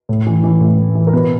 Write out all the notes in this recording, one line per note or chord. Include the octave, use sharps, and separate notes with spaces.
A2
E3
E3
A2
A2
E3
A#4
B2 B4